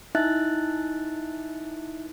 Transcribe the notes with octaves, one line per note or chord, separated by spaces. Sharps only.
D#4 E4 E5 F#6 A6